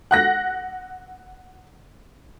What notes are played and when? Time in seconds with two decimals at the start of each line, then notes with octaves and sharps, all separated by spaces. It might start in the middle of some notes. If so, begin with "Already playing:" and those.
0.11 F#5 F#6 A#6